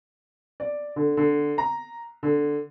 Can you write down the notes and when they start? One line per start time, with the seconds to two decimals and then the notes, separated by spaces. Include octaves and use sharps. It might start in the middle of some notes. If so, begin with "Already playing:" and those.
0.60 D5
0.96 D3
1.17 D3
1.58 A#5
2.23 D3